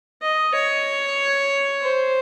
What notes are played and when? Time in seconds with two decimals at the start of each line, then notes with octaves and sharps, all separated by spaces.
0.22 D#5
0.55 C#5
1.82 C5